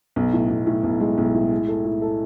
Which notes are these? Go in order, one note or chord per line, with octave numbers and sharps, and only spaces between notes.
B1
A2
B1
A2
B1
G#3
B1
A2
G#3
A4
A2
A4